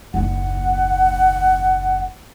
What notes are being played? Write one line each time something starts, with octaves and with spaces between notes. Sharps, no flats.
F#1 D#2 F#5